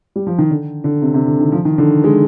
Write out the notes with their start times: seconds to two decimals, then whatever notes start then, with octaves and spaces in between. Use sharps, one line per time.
0.16 G3
0.27 F3
0.38 D#3
0.50 D3
0.84 D3
1.02 C3
1.14 C3
1.27 D3
1.40 D#3
1.52 F3
1.65 D#3
1.78 D3
2.04 G#3